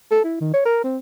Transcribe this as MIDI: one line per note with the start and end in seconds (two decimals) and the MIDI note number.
0.11 0.22 69
0.24 0.38 64
0.41 0.52 51
0.54 0.63 73
0.65 0.82 70
0.84 0.98 60